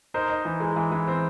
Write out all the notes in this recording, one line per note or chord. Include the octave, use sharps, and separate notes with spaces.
D#4 A#4 C5
D#4
E3
G#3
E3
E3
C4